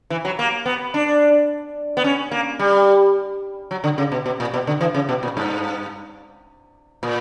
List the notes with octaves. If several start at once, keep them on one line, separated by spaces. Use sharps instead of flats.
E3
F#3
A#3
B3
D4
B3
C#4
A#3
G3
F#3
D3
C#3
B2
B2
A#2
B2
D3
E3
C#3
B2
A#2
G2
A#2